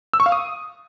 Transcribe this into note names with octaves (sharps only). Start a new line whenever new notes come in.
E6
C#6
F5
D#6